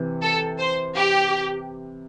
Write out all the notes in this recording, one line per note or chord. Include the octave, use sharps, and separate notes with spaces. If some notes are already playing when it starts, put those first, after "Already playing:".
Already playing: C3 E3
A4
C5
G4